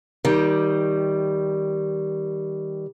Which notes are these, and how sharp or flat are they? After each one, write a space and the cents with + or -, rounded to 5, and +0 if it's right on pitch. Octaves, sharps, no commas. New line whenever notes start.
D#3 +20 G3 -5